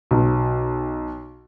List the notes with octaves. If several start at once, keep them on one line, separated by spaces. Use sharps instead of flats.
B1